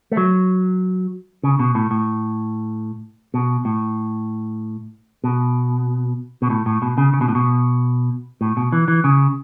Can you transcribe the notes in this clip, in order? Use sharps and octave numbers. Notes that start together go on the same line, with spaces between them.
A3
F#3
C#3
B2
A2
A2
B2
A2
B2
B2
A2
A2
B2
C#3
C#3
B2
A2
B2
A2
B2
E3
E3
C#3